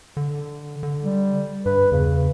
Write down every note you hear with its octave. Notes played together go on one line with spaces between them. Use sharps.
D3
D3
G3
G2 B4
E2 C#3